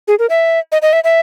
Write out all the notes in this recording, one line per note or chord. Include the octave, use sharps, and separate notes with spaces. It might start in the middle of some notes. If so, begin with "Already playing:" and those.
G#4
A#4
E5
D#5
D#5
E5
E5